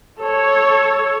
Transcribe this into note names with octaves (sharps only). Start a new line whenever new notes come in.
A4 C#5